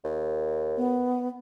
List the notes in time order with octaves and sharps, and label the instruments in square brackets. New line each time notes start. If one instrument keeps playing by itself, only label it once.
[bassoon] D#2
[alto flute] B3